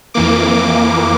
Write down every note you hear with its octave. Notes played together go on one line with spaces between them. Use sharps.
F2 E3 A#3 D6
D6